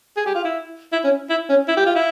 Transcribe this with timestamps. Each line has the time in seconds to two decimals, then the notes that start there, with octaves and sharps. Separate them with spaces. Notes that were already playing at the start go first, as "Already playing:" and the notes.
0.17 G#4
0.26 G4
0.35 F4
0.44 E4
0.92 E4
1.04 C#4
1.29 E4
1.49 C#4
1.68 E4
1.77 G4
1.86 F4
1.95 E4